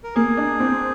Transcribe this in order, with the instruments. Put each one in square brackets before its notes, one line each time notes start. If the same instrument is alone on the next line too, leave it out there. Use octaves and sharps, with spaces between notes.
[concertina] A#4
[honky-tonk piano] A#3 [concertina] G#4
[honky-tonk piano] D4
C4